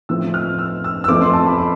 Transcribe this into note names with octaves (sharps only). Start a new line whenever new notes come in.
A2 F3 C4 E6
F6
E6
E6
E6
F2 E3 A3 C4 D6
C6
A5
B5
B5